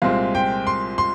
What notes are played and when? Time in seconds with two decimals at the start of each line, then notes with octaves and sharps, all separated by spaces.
0.02 C2 A#2 G#3 C4 F5
0.35 G5
0.67 C6
0.98 C6